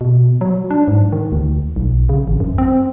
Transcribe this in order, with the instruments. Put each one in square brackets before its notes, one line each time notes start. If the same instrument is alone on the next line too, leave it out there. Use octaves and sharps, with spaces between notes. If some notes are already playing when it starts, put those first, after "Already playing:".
[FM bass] B2
F#3
D4
G#2
D#3
D2
B1
C#3
A1
F#2
C4